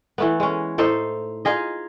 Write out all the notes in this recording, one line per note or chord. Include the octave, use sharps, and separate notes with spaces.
E3 A3 B3
G#3 C#4
A2 D#4 A4 C5
D#4 F4 G#4 D#5